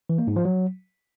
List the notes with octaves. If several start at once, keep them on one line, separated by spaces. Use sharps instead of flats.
E3
A#3
G#2
F3
F#3